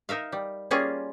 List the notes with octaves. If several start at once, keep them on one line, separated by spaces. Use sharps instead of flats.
D#4 A#4 E5 F5
G3
G3 A#3 C#4 F4 G#4